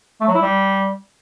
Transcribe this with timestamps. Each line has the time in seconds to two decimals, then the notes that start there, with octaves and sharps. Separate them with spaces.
0.21 A3
0.28 F#3
0.35 E4
0.42 G3